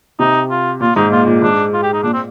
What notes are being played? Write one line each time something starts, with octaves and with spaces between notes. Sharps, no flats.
C3 D#4
F4
A#2 F4
G#2 D#4
A#2 F4
A#2
G#2 D4
F4
G4
D#4
A#2 D4
C4